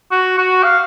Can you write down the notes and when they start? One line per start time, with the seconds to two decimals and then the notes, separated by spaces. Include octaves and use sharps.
0.11 F#4
0.38 F#4
0.64 F5